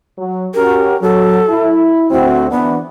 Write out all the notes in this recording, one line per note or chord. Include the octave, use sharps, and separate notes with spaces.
F#3
C#4 F#4 G4 A#4
F#3 A4
E4
D2 C4 E4 F#4
E3 B3 D4